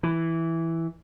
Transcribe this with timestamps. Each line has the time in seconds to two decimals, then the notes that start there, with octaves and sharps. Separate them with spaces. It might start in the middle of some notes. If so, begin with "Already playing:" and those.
0.03 E3